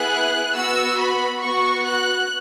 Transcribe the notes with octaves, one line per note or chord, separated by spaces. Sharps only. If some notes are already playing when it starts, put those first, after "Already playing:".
Already playing: B3 E4 G#4 F#6
B3 F#4 E6
B5
B3 F#4 C#6
F#6